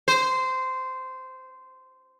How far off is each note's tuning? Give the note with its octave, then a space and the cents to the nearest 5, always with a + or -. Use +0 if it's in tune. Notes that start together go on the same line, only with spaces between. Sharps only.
C5 -15